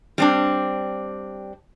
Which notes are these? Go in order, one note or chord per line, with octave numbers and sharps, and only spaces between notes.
G3 C4 D4